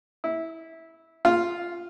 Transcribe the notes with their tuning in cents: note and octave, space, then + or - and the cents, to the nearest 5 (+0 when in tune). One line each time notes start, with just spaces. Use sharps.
E4 -15
F4 +0